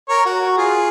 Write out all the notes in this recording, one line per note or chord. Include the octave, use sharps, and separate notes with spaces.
A#4 C#5
F#4
F4 G#4